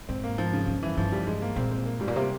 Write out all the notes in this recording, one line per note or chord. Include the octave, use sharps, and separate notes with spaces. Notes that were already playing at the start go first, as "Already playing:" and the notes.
G#2 C4
A#3
F3
C#3
G2 C#3
E3
G2 F3
G3
G#3
A#3
A#2 C4
C4
A#3
G#2 G3
A#2
C3 A#3